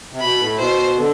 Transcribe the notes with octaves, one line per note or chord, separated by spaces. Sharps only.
C3
B2 B5
A2
B2 C5
D3